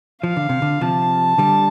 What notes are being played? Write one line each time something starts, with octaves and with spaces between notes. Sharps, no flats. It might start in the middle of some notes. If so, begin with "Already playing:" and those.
F3 F5
D3
C3
D3
C3 F3 A5
D3 G3